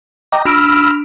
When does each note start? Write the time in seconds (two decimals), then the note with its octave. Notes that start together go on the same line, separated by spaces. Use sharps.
0.32 D#5 G5 A#5 D6
0.45 D4 B5 E6 F6 A#6 D7